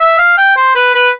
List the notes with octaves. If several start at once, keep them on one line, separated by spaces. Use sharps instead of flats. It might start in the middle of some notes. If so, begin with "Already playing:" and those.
E5
F5
G5
C5
B4
B4